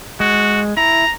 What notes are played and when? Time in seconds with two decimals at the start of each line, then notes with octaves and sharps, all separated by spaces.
0.20 G#3 F#4
0.77 E4 A#5